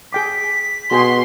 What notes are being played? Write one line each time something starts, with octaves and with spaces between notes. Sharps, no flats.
G#4 G5 D6 B6
B2 F#4 G#4 G5 C6